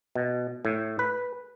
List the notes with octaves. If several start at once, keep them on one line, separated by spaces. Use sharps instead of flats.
B2
A2
B4